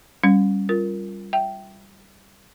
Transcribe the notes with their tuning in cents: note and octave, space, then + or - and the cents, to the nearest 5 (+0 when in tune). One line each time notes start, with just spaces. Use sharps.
G3 +0 C#4 +0
F4 -5 A#4 +0
E5 +0 G5 -15